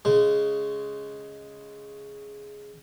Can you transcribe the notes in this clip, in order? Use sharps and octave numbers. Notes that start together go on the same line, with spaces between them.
C#3 G#3